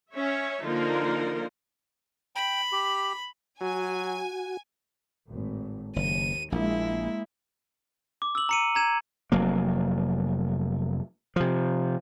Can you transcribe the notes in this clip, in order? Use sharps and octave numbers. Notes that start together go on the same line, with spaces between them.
C#4 C#5 E5
D3 F3 A#3 D#4 F4 A#4
G5 B5
G4
F#3 F#4 G#5
G#1 A2
F#1 D#2 D#7
A#1 G#3 A#3 E4
D6
E6 F#7
A#5 C#7 D#7
A#5 G#6 E7
F1 F#3 A#3
C3 F3